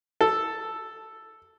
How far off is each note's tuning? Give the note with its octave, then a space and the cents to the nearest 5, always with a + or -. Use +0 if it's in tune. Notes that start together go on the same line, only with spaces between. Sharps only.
A4 +0